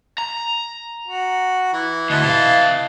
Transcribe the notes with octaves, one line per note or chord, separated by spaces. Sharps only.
A#5
F#4
E3
D2 E3 D#5 A5
C3 F5